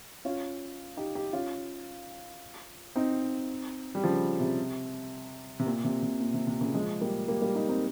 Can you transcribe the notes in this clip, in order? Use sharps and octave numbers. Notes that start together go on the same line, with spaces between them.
C#4 F4
D#4 G4
D#4 G4
C#4 F4
C4 D#4
G3
C#3 F3
C3
C3
A#2
C3
C3
A#2
C3
C3
A#2 C#3
F3 G#3
G3 A#3
G3 A#3
G3 A#3
D#4 G4
C4 D#4